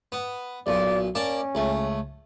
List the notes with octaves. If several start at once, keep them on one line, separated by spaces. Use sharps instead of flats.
B3
B1 A#2 D5
A#3 C#4 D5 A5
C#2 A3